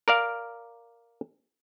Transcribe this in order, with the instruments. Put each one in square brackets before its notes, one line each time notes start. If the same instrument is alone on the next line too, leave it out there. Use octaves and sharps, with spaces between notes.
[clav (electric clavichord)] A#4 D5 F5